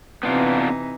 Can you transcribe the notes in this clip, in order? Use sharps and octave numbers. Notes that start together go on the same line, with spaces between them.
C3 E3 B3 D4 D#4 F4